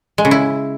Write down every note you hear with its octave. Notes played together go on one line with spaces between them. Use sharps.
G#3
C#3
E4